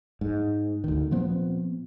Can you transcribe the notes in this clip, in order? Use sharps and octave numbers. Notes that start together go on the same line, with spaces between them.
G#2
D2 D#3
A#2 F3 B3 C4